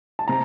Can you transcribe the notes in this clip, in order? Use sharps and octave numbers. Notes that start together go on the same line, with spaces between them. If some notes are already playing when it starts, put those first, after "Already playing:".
A5
C3 A#5